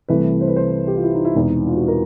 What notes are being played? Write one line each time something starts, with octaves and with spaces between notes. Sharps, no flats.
C2 C3 E3 A3 B4
C5
B4
C5
B4
G4
F4
E4
D#4
E4
E1 E2 C3 D#4
E4
F4
F#4
A#4